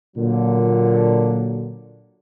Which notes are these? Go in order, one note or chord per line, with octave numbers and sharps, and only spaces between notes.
A#2 D3 F#3